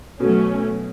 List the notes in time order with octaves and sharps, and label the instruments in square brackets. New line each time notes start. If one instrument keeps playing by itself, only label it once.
[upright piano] B2 [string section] F#3 A3 C#4